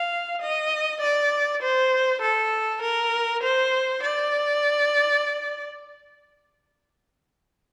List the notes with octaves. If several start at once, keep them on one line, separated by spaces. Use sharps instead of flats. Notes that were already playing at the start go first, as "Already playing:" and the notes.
Already playing: F5
D#5
D5
C5
A4
A#4
C5
D5